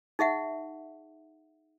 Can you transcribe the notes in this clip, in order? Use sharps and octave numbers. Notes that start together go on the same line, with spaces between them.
D#4 G#4 E5 F#5